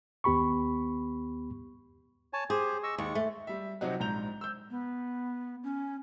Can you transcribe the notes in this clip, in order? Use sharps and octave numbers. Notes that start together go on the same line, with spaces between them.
D#2 B3 G4 B5 C#6
C#5 G#5 A5
G4 G#4 C5
D#5 C#6 E6
D#2 G#3 C#6
A3
G3 E5
C3 F3 F#3 C4 D#4 F#4
A#1 G#2 A#5 G6 F7
E6 G6
B3
C#4